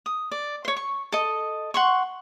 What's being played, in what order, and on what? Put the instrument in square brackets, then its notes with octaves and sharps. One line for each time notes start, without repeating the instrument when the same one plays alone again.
[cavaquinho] D#6
D5
C5 C#5
C#6
A4 D#5
F#5 C6 C#6